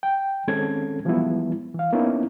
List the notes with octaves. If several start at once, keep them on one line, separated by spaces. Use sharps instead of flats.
G5
D#3 G#3 C4 C#4 A4 G#6
E3 F3 G3 G#3 B3 E4
E3 F5
A#3 B3 C#4 D#4 E4